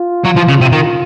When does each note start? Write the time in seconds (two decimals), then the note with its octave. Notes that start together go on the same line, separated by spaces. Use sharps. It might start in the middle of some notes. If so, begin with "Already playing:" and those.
Already playing: F4
0.25 F#3
0.36 F3
0.48 C#3
0.61 C3
0.72 D#3 F4